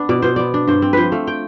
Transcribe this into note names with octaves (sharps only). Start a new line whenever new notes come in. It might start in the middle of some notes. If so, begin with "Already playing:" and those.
Already playing: B3 D4
B2 D5
B2 C5
B3 D5
D4
G2 C5
C4
F3 B4 C5
A3 F5
G5